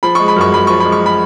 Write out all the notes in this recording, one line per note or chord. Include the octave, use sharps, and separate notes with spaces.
F3 B5
G#3 C#6
B5
F#2 C#6
F#2 B5
F3 C#6
B5
G#3
C#6
B5